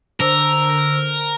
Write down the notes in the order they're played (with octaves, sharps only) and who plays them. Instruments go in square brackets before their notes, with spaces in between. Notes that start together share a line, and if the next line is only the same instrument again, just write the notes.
[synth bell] D3 C5 [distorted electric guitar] A#4 [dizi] E6